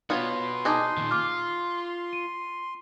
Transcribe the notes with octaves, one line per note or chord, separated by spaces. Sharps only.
B3 F4 F#4 B4 C#5 C6
D#4 G#4 A5 D6 F#6
A#2 D#3
F4 D6 F6
D#7